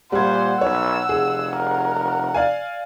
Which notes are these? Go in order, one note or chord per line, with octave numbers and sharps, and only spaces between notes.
A#2 G3 C5 F#5 G#6
B1 C#5 E6
F1 G#4
A#4
D5 F5 G#5